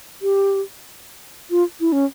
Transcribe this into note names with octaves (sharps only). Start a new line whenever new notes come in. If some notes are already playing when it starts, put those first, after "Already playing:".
G4
F4
E4
C#4